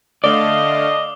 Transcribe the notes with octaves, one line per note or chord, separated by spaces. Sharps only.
D3 A3 D5 D#5 F5 D6 D#6 G7